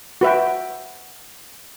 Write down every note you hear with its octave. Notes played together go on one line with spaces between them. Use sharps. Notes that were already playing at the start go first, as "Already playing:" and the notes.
F#4 B4 E5 G5